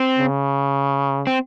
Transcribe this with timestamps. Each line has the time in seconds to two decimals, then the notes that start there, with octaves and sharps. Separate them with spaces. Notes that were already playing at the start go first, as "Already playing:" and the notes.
Already playing: C4
0.19 C#3
1.27 C4